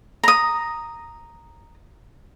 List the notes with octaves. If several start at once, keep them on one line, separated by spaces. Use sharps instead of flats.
A#5 D#6